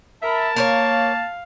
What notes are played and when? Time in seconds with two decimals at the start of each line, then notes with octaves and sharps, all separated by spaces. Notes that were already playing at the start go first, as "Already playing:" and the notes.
0.22 A#4 E5 A5 B5
0.56 A#3 A#4 C5 C#5 F5